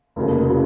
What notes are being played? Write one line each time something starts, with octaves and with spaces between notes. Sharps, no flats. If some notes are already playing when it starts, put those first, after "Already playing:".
F1 D#2 C#3 F#3
C#3 F#3